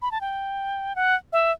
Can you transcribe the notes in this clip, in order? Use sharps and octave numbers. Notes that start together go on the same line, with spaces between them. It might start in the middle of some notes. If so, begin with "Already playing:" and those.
B5
A5
G5
F#5
E5